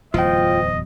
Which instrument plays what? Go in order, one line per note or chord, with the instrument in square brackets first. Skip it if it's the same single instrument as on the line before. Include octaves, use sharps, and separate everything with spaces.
[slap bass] D1 E2 F#3 [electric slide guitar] F4 G5 [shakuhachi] C5 [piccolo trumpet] D#5